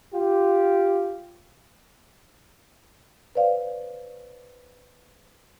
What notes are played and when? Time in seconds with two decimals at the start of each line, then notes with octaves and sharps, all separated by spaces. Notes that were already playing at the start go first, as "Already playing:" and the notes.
0.13 F4 G4
3.35 B4 C5 D5 F5